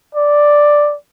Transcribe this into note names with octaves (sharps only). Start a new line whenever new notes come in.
D5